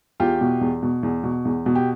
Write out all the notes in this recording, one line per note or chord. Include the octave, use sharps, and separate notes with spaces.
E2 F4 G4
B2
E2
B2
E2
B2
E2
B2
G4